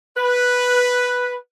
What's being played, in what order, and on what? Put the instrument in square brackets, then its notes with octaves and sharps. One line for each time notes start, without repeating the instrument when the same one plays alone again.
[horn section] B4